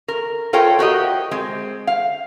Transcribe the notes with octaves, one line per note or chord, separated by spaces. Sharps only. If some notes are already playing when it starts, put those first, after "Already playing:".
A#4
F4 A4 A#4 C5 C#5 G5
F#4 G4 A#4 D#5
G#3 C4
F5